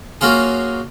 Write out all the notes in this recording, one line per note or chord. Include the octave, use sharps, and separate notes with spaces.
F#3 A#3 C#4 F4 G#4